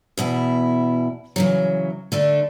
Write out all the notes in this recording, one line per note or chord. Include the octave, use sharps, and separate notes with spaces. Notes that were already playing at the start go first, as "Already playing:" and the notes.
E2 B2 E4
C#3 E3 F#3
D3 A3 D4